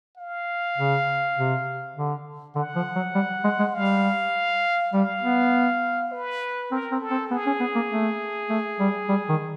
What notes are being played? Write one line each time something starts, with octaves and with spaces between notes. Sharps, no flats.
F5
C#3
C3
D3
D3 F#5
F3
F#3
G3
G#3
G#3
G3 F5
G3 F5
B3
B4
C4 A#4
C4
A4
C4
B3 G#4
C#4
B3
A#3
A3
A3
G3
G3
D#3